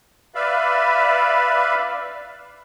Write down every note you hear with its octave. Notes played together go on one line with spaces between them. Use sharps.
B4 D5 E5 F5 B5